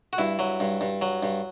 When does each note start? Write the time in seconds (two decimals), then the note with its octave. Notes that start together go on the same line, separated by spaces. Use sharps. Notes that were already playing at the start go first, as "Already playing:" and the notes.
0.13 F#4
0.18 G2 E4
0.39 F#3
0.60 G2
0.81 G2
1.02 F#3
1.23 G2